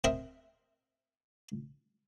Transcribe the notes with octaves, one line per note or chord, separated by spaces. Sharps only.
C4 A#4 D#5 E5